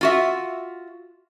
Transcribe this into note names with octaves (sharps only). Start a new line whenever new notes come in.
F4 F#4 E5